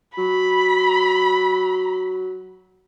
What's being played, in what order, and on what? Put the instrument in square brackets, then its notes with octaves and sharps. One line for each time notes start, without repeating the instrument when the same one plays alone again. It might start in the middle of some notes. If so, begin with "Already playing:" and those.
[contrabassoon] F#3 [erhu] B5